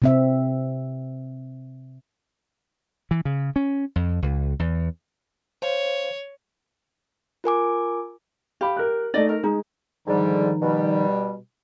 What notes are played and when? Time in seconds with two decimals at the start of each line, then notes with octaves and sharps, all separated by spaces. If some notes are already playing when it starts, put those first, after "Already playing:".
0.02 C3 C4 E5
3.11 E3
3.25 C#3
3.56 C#4
3.96 F2
4.22 C#2
4.59 E2
5.62 C5 C#5 F5
7.44 F4 A#4 G#5 D6
8.61 G4 F5 B5
8.77 A#4 F#6
9.14 A3 D#4 D5 D#5
9.29 A#4
9.43 G#3 D#4
10.07 G#2 D3 D#3 F3 G3 D#4
10.62 B2 G3